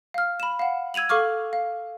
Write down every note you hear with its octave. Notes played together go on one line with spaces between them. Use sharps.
F5 F6
B5 E7
F5 F#5
E6 G#6 D#7 F7 F#7
A4 F5 C#6 D6 F6
F5